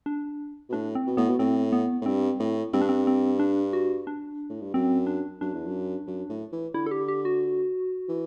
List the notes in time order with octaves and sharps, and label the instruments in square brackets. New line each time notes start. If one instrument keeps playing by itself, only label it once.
[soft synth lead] D4
[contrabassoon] B2
[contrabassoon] A2 [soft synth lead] D4
[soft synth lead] C4
[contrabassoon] B2
[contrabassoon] A2 [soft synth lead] B3
[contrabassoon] B2
[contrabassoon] A2 [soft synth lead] C4
[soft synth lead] B3
[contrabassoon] A2
[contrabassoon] G2 [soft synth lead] C4
[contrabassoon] A2
[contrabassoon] G2 [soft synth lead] C4
[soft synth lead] D4
C4
C4
D4
F#4
D4
[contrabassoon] A2
G2
[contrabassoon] F#2 [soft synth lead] C4
[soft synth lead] D4
[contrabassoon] F#2 [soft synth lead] D4
[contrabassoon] E2
F#2
F#2
A2
E3
[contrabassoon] D3 [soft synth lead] E4
[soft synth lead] A4
G4
G4
F#4
[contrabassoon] E3